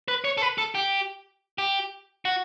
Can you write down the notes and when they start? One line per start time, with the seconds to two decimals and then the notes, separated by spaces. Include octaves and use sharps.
0.08 B4
0.24 C#5
0.38 A4
0.42 B4
0.58 A4
0.75 G4
1.58 G4
2.25 F#4